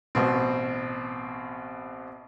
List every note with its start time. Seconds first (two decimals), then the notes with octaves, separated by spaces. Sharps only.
0.15 A1 B2 C4